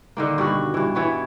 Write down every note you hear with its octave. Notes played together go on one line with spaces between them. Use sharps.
D3 D#3 A#3
G2 B2 F#4
G2 E3
E3 B3 C#5